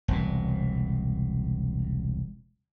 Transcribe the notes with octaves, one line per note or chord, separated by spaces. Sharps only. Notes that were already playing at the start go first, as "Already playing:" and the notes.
E1 C2 A#2